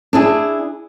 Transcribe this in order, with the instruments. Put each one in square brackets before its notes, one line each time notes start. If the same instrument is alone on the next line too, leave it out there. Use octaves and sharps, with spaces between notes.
[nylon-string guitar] D4 E4 G#4